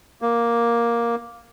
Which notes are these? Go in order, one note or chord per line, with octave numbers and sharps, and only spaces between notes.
A#3